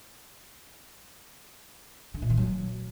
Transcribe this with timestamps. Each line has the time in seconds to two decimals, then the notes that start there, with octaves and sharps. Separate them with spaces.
2.14 D3
2.22 A#2
2.30 D#3
2.37 F#3